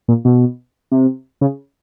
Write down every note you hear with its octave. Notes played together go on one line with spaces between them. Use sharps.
A#2
B2
C3
C#3